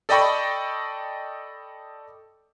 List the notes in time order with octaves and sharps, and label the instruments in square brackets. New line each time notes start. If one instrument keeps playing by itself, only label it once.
[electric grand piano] A4 D5 D#5 G5 B5 C#6